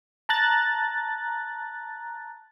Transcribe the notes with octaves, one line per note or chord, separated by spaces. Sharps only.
A5 A#5 F#6 A6